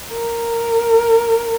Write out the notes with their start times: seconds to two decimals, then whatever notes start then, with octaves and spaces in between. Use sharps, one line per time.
0.12 A#4